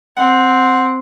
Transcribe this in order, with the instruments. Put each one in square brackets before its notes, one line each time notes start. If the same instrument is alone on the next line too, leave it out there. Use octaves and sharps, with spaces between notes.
[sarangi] C4 [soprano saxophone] F#5